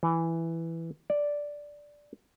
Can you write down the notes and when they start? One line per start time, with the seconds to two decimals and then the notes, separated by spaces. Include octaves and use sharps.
0.03 E3
1.10 D5